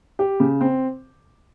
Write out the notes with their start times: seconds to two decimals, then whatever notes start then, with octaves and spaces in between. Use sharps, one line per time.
0.19 G4
0.40 C#3
0.61 C4